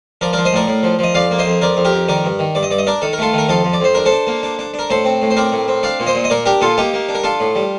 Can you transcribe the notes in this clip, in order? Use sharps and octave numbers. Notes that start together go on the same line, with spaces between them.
F3 A#4 D5
F3 A#4 D5
C5 D#5
A2 A#4 D5
A2
F3
F3 D#5
F2 D5 F5
A#3
C5 D#5
F2
F2 A#4 D5
F2
G4 A#4
F2
D#3 A#4 D5
G2
D#3
G2 D5
D#5
G2 D5
D#5
D4 A#4 D5
D#3 A4
A#4
A3 F4 A4
D#3
A#4
F2 F4 A4
F2
D5
F2 C5
D4 A#4
A4 C5
D4
A#3
D4
D4
D4
A#4
A2 A4 C5
C4
A2
C5
C4 A#4 D5
A2
C4
D4 D5 F5
A#2
C5 D#5
A#2
D#5
A#2 A#4 D5
D4 G4 A#4
A#2 F4 A4
A#3 D#4 G4
A#3
D4
A#4
D4 F4 A4
A2
G3